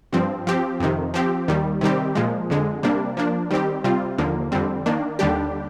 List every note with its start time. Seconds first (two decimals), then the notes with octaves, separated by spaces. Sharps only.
0.13 G2 F3 C4
0.47 F3 C4 G4
0.80 F2 C3 D#3
1.14 F3 C4 G4
1.48 D#2 D#3 G3
1.81 C3 D#3 G3 C4 G4
2.15 A#2 F3 G#3
2.50 F2 D3 G#3
2.83 C3 G3 A#3 D4
3.17 F3 A#3 D4
3.51 D#3 G3 C4 G4
3.84 C3 G3 C4 F4
4.18 D#2 D3 F3 A#3
4.52 F2 D3 G3 C4
4.86 D#3 A#3 D4
5.19 D#2 D3 G3 D4 G4